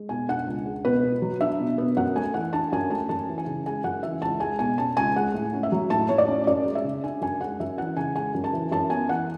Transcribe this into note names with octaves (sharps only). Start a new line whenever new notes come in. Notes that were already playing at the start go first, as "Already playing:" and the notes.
Already playing: G#3
B2 G#5
D4 F#5
C#2
G#3
B2 B4
B3
F#3
D4 E5
B2
B3
F#2 F#5
A3 G#5
E3 F#5
D4 A5
F#2 G#5
A3 A5
F#2 A5
E3
G#5
C#3
G#3 G#5
F#2 F#5
E3 E5
C#2 A5
G#3 G#5
B2 G#5
C#4 A5
C#2 G#5
G#3 F#5
A2
C#4
E5
F#3
A2 A5
A2 C#5
D5
C#4
F#2 D5
G#3
E5
C#3
D4 G#5
F#2 G#5
G#3 F#5
F#2 E5
E3 F#5
C#3 G#5
G#3 G#5
F#2
A5
E3
F#2 A5
B3 G#5
E3 F#5